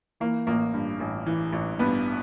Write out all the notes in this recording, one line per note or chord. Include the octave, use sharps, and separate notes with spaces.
E3 A#3
A1 A#3
G2
A1
E3
A1
G2 B3